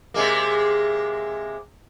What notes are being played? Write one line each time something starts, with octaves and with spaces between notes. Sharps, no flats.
C3 G#3 A#3